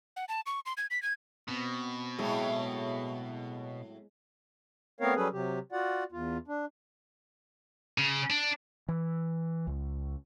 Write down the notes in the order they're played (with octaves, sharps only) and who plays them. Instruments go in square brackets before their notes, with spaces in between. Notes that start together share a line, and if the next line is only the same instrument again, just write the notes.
[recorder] F#5
A5
C#6
C6
G#6
B6
G#6
[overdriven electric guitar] B2 [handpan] B3 C4
[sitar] A2 F#3 [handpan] G#3 E4 G#4
[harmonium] A3 B3 C4 A#4 C#5 F5
F#3 G3 C#4 G#4 A4 B4
C3 F#3 G4
F4 F#4 D5 F#5
E2 F4
D4
[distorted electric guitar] C#3
D4
[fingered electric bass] E3
C#2